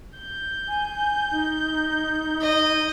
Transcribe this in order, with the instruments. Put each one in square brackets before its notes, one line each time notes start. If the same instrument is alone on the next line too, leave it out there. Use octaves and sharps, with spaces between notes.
[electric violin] G6
[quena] G#5
D#4
[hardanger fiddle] D#5